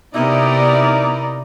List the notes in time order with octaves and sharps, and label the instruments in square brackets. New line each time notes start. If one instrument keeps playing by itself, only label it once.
[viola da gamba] C3 B3 [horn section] D#4 E4 A#4 [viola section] D5 A#5